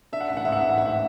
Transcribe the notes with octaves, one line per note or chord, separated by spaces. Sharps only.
D4 E5
F#5
A1 E5
F#5
G#2 E5
F#5
E5
A1
F#5
E5
A1 F#5